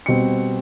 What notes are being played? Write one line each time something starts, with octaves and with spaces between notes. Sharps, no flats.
B2 G3 C4 C#7